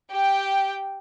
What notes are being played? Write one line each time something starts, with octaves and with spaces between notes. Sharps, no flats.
G4 G5